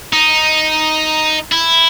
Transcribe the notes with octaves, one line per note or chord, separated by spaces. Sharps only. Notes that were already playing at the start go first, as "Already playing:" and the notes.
D#4
E4